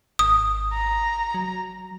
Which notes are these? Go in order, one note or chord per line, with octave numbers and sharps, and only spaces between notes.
G#1 D#6
A#5
F#3